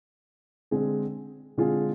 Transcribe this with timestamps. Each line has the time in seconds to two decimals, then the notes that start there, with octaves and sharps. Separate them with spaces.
0.71 D3 G#3 C4 G#4
1.57 D3 G#3 C4 F4 G#4